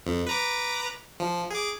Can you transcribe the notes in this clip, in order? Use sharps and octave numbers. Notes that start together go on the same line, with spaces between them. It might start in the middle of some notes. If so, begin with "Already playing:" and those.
F2
B4 A#5 D6
F3
G#4 D6